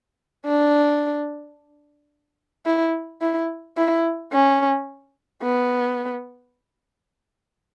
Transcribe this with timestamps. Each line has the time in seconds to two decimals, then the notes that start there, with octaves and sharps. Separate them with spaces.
0.46 D4
2.66 E4
3.21 E4
3.77 E4
4.32 C#4
5.42 B3